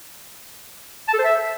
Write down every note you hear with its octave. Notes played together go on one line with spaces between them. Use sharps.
A5
A4
C5
E5